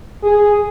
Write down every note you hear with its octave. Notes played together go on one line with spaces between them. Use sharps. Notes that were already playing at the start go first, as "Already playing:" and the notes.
G#4